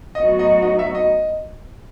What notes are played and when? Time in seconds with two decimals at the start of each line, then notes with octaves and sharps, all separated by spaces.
0.15 A2 F#3 B3 D#4 F#4 D#5
0.39 D#5
0.62 D#5
0.79 E5
0.95 D#5